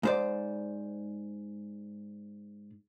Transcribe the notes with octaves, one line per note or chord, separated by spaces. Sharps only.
G#2 C5 D5